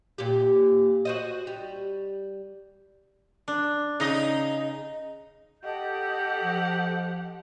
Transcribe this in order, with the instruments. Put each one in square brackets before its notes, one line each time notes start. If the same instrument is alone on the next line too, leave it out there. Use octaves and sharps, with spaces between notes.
[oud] A#2 G4
F#4 C5 D#5
G3
[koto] D4
[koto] C#3 [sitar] D#4 D#5
[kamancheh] G4 F#5 [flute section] A4 D#5 G6
[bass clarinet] F3